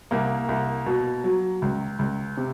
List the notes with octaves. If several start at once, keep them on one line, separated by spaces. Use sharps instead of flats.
C2 A#3
C2
B2
F#3
C#2
C#2
C3